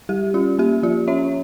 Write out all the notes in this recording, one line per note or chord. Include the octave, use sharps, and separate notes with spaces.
G3 G4
C#4 F4
A#3 G4
F3 F4
C#4 C#5 E5